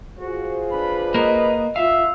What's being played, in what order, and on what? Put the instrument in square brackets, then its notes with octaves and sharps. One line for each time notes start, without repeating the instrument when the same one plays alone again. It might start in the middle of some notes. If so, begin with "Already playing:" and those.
[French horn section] F4 G#4 C5 [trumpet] F#4
[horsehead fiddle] D4 B5 [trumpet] B4
[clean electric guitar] A#3 A#4 [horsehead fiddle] D#5
[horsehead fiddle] F4 [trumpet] E5 [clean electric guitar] F5